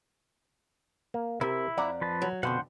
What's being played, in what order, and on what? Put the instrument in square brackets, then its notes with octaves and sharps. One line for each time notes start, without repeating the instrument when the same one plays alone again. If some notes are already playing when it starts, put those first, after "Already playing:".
[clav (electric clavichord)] A#3
[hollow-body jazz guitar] C3 [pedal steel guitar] E4 E5 [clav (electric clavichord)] A#4
[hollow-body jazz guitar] F2 F#5 A#5 [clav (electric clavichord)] D5
[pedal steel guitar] F3 B4 A5
[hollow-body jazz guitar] F#3
[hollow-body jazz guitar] F2 D3 [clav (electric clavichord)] B2 [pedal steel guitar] C5 F#5